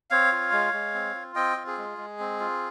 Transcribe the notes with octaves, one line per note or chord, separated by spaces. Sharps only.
C4 C#5 F5
F4
G#3
G#3
C4
F4
C4 D#5 G5
F4
G#4
G#3
G#3
C4
F4